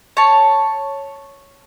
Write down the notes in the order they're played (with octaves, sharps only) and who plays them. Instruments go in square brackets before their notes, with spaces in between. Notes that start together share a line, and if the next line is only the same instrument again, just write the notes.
[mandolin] C#5 A5